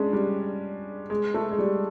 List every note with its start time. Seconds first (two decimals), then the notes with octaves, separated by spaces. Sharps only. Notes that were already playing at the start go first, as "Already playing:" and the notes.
Already playing: G#3 C#4 D4
0.13 G3
1.10 G#3
1.34 A3
1.51 G#3
1.59 G3